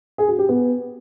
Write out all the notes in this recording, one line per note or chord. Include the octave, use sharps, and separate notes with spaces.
G#4
F#4
G4
B3